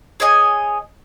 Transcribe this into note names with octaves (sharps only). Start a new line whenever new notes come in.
G#4 C#5 D#5 G#5